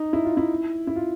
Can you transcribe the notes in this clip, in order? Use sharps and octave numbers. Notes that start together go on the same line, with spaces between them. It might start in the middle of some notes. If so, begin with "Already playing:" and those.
Already playing: D#4
E4
F4
E4
E4
F4